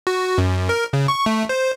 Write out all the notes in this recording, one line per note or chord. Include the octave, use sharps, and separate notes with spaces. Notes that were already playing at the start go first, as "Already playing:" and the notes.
F#4
F#2
A#4
C#3
C#6
A3
C5